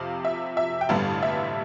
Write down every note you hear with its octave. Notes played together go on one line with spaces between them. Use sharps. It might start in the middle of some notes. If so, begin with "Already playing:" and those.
Already playing: F2 C3 F3 F5
E5
E5
G5
A1 G2 D3 G3 B3 F5
E5